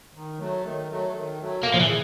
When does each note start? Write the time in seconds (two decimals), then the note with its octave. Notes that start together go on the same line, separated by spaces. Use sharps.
0.14 D#3
0.38 F#3 A3
0.63 D#3
0.88 F#3 A3
1.14 D#3
1.39 F#3 A3
1.63 A#2 A#3
1.74 F3
1.80 E3
1.88 G#4